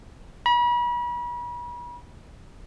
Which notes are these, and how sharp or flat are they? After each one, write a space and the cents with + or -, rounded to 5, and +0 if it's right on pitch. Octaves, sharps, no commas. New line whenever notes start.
B5 -40